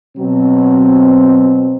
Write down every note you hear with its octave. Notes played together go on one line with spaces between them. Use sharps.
B2 F#3 C4